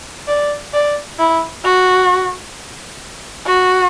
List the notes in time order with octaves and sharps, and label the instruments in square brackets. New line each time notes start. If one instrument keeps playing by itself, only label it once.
[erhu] D5
D5
E4
F#4
F#4